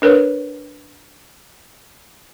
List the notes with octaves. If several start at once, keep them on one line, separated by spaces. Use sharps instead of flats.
D4 A#4 B4 C#5